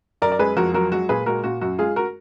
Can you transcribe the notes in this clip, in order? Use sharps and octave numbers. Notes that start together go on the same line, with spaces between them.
F#2 A#4 D5
D5
G#3 G#4 B4
F2 F#4 A#4
F#3 F#4 A#4
G#3 F#4
A#2 G#4 B4
G#3 F#4 A#4
A#2 F#4
F#2 F#4
G#3 F4 G#4
F#4 A#4